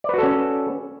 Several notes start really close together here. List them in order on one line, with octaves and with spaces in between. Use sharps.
D5 B4 F#4 A4 C#4